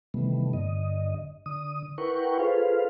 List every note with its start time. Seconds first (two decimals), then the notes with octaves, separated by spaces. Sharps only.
0.14 C3 D#3 E3 G3 A3 B3
0.53 G2 D3 D#5
1.46 D3 D#6
1.98 E4 A#4 B4 F#5 G5 C#6
2.39 F4 G#4 A4 B4 C5 F5